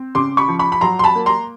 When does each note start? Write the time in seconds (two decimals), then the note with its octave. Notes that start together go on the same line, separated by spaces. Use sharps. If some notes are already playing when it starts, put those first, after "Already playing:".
Already playing: C4
0.15 C#3 C6 D6
0.37 B5 C#6
0.48 F3
0.59 B5 C#6
0.72 B5
0.81 F#3 A#5 C6
0.99 C6
1.04 A5 B5
1.15 A#3
1.26 A#5 C6